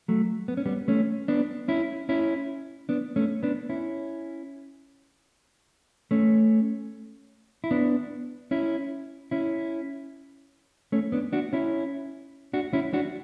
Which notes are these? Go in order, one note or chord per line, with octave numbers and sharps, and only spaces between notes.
F#3 A3
B3
C#4
G3 B3
A3 C#4
B3 D4
C#4 E4
C#4 E4
B3 D4
A3 C#4
B3 D4
C#4 E4
A3 C#4
E4
B3 D4
C#4 E4
C#4 E4
A3 C#4
B3 D4
D4 F#4
C#4 E4
D4 F#4
C#4 E4
D4 F#4